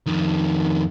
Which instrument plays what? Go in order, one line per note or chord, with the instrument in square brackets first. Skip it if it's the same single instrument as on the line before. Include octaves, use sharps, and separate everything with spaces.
[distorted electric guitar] F2 D#3